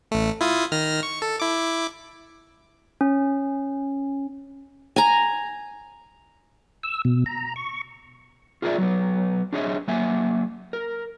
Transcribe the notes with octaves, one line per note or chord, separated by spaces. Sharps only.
A1 A3
E4 F4 D#6
D#3 F6 A#6
C#6
A4
E4 D6
C#4
G#5 A#5
E6
B2
A#5
C#6
F4 G#4 A#4 C5 D5 E5
F#3 B3
D4 G#4 C#5 D#5 E5
F#3 A#3 E5 F#5 G#5
A#4